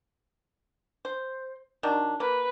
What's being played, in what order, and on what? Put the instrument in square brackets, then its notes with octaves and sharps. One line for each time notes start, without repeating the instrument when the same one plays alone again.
[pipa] C5
D#3 F#3 D4
[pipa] A#3 [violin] B4